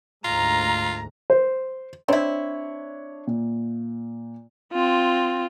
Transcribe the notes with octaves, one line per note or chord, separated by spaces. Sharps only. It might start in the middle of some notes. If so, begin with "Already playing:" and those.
D2 G#2 F4 A#5
C5
C4 D4 E4 C#5
A#2
C4 F4